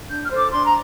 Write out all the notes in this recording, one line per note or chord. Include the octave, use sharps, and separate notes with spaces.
D4 G6
F6
A4 C5
D6
D4 C6
A#5